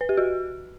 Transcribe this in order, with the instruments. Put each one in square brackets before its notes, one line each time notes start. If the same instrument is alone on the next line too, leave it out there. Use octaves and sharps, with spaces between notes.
[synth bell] B4
G4
F#4